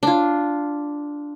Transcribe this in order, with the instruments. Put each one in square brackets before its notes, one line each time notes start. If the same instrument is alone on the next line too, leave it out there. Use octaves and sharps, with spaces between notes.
[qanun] D4 F4